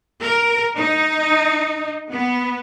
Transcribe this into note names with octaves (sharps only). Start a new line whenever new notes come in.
A#4
D#4
B3